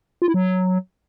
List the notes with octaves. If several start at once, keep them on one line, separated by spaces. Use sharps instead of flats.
F4
E4
F#3